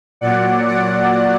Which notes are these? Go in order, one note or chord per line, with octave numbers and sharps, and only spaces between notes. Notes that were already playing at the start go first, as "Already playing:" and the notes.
A#2 F#3 D5 F#5
D5 F#5